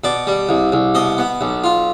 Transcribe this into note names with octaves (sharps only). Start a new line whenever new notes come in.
B2 D5
G3
C2
C2
B2 D#5
B3
B1
F4